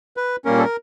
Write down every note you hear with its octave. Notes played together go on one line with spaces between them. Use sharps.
B4
A#2 G3 A#3 C#4 A#4
A4
A#4